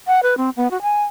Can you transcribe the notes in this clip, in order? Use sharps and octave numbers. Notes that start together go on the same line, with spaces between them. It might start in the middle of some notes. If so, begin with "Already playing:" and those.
F#5
B4
C4
B3
F#4
G#5